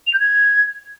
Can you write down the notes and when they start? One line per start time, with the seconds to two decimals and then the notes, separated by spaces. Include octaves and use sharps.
0.07 F7
0.13 G6
0.20 G#6